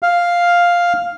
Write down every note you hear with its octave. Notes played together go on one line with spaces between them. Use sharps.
F5